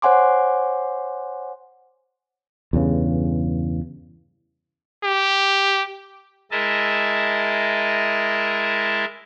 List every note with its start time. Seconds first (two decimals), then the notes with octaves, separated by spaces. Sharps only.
0.02 C5 C#5 F#5 G#5 C6 D6
2.73 E2 G2 C#3
5.04 G4
6.51 G#3 E4 A#4 D#5 E5 A5